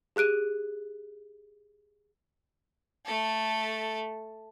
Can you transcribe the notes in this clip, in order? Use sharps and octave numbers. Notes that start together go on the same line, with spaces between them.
G4 G#4 F#6 D7 D#7
A3 A4